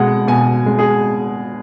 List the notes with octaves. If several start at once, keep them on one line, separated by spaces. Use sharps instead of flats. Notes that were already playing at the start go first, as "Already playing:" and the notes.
Already playing: B2 G#3 F#5
B2 G#5
G#3
G#4